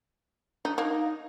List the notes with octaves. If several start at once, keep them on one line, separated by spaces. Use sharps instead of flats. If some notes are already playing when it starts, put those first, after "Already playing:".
D4 D#4
A#3 D#4